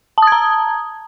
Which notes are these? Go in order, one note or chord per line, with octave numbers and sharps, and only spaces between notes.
A5 A#5 D#6 G#6